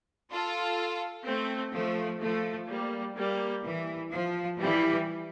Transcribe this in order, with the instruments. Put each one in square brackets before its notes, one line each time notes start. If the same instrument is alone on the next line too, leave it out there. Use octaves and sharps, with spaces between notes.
[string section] F4 A4
A3 C4
F3 A3
F3 A3
G3 A#3
G3 A#3
E3
F3
E3 G3